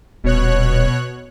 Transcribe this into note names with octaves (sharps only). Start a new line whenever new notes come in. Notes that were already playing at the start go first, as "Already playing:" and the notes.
D#1 B2 C#5 F#6